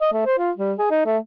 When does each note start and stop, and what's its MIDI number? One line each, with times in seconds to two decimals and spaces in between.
0.01 0.11 75
0.13 0.25 57
0.26 0.38 72
0.39 0.51 65
0.57 0.73 55
0.79 0.87 68
0.91 1.02 63
1.06 1.18 57